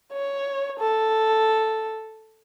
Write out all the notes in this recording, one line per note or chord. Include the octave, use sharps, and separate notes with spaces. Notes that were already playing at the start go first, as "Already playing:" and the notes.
C#5
A4